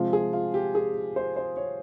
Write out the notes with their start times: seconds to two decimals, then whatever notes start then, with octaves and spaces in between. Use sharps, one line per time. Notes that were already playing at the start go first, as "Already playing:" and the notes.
Already playing: C3 F3 G#3 F4
0.13 G#4
0.33 F4
0.54 G4
0.75 G#4
1.16 C5
1.36 C5
1.57 C#5